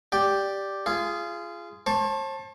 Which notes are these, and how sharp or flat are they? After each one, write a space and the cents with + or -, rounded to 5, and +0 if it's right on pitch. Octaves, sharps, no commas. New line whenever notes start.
G4 +0 D5 +0 G5 +0
F4 -25 G#4 +0
C5 +45 A5 +0 C#6 +30